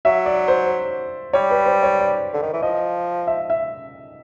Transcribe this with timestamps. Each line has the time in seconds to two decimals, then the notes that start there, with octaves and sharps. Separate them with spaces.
0.05 F#3 E5
0.26 D5
0.48 C5
1.33 G3 C#5
1.51 B4
1.66 C5
1.83 C#5
1.99 D5
2.33 D3
2.43 D#3
2.53 E3
2.63 F3 D#5
3.27 E5
3.50 E5